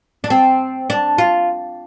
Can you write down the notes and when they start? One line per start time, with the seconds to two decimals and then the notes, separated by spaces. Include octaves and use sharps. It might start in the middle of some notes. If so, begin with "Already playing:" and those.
0.24 D4
0.30 C4
0.90 D4
1.18 F4